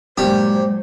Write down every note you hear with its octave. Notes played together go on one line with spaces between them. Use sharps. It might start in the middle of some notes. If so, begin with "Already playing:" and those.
G2 A#2 F#3 G#3 G4 C5